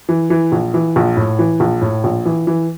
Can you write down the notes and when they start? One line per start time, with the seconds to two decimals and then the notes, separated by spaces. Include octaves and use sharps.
0.09 E3
0.30 E3
0.52 A#1
0.74 E3
0.96 A#1
1.17 A2
1.39 E3
1.60 A#1
1.81 A2
2.04 A#1
2.26 E3
2.47 E3